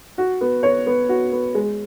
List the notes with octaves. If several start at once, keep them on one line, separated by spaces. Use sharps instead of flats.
F#4
B3
C#5
B3
F#4
B3
G#3